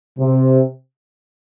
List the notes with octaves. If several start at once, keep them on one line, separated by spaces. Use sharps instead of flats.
C3